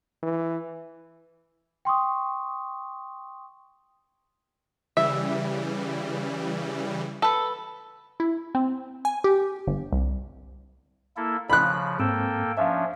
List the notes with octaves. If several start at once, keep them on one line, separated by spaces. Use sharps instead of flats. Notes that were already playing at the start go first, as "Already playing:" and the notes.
E3
G5 C6 C#6 D#6
C#3 E3 G3 E5
A4 B4
E4
C4
G#5
G4
G1
C2
A#3 E4 A4
C#3 F3 B5 F#6
G#2 A#3 C4 A4 G5 E6
F3 C#4 D4 E5 F5